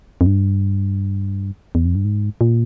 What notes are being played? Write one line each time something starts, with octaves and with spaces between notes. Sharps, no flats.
F2
G2
E2
F2
G2
G#2
A#2